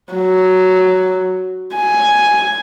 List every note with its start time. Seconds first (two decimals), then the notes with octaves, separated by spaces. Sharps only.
0.13 F#3
1.76 G#5